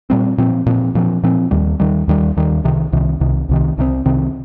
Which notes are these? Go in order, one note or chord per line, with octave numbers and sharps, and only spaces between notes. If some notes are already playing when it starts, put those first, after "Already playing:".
A#2 G3 C4
A#2 F3 C4
A#2 F3 C4
A#2 F3 C4
A#2 F3 C4
D#2 D#3 G3
D#2 D#3 G3
D#2 D#3 G3
D#2 D#3 G3
C2 C3 D#3
C2 C3 D#3
C2 C3 D#3
C2 C3 D#3
C2 C3 D#3 C4
C2 C3 D#3 C4